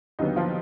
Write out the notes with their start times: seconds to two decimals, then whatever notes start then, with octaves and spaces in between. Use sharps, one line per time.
0.19 D#2 D3 F#3 B3 D#4
0.36 F3 F4